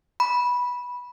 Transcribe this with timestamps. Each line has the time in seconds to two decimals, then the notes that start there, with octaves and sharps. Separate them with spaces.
0.20 B5